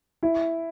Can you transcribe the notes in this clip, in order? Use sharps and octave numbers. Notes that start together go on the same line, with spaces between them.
E4